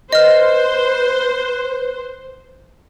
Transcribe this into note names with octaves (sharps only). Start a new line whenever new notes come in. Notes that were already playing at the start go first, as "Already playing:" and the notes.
B4 C5 D#5 F6